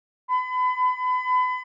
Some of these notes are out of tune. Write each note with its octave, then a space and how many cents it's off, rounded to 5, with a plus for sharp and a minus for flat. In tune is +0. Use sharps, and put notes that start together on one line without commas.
B5 +35